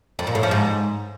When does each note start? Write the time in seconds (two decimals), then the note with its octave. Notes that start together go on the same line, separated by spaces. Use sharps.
0.19 F2
0.27 A#2
0.35 A2
0.43 F3
0.51 G#2